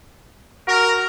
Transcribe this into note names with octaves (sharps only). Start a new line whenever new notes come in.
F#4 A#4